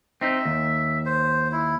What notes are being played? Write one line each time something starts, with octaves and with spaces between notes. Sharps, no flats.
C4 D#4 E5
D#2
C5
E4